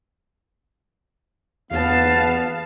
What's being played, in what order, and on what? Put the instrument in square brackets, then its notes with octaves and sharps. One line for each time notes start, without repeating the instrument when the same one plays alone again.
[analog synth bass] E2 [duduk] B3 [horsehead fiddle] F5 A5